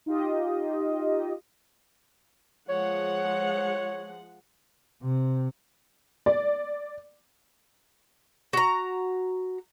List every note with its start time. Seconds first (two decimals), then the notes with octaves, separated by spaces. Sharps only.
0.06 D#4 F4 G4 D#5
2.69 F3 G#3 C#5 F#5
5.03 C3
6.26 D5
8.53 F#4 A#5